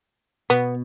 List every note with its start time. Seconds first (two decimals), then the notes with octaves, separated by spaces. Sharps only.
0.50 B2 B3